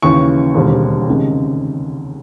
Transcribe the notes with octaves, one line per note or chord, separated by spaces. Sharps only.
D#2 C#3 E3 C#6
E1 D#2 D3 G3 C4
C#2 C3 D#3 G#3